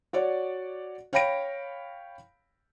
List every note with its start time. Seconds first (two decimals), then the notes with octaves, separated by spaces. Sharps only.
0.13 F#4 C#5 D5
1.13 C#5 F5 G5 B5 A#6 D7